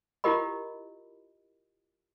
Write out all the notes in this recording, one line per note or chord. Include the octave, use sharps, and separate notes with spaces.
E4 F4 G4 A#4 D#5 B5